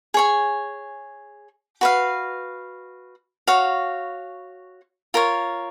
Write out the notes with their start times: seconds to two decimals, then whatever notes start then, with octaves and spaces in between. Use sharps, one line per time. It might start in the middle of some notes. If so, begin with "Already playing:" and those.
0.14 G#4 C#5 G#5
1.81 F#4 B4 F5
3.47 F#4 C#5 F5
5.14 F4 A#4 C#5